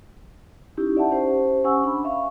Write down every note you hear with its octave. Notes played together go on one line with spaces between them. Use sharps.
C#4 D#4 E4 G4
D5 E5 F#5 A5
C#4 G4 C5
C#4 G4 F#5 G#5 C#6 E6
D4 B5
E5 F5 C#6